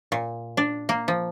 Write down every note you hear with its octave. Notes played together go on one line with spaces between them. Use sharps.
A#2
D4
A#3
F3